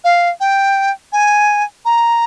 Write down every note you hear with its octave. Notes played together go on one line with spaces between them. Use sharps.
F5
G5
G#5
A#5